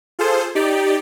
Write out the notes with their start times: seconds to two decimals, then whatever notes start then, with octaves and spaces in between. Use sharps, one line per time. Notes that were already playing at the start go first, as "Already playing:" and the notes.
0.19 F4 G#4 A4 C5
0.55 D#4 G4 D5